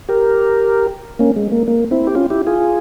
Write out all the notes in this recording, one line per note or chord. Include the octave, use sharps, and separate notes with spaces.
G4 A#4
A#3 C#4
G#3
A#3
A#3
C4 E4
G4
C#4 F4
E4 G4
F4 G#4